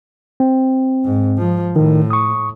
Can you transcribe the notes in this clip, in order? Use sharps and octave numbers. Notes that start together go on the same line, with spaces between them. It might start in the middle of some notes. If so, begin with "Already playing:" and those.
C4
G#2
F3
A2 D#3
C#6 D#6